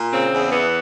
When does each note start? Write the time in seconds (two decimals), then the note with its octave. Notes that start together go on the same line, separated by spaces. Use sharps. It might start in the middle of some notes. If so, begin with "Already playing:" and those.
Already playing: A#2
0.11 C#3 C4
0.32 E2
0.52 E3 B3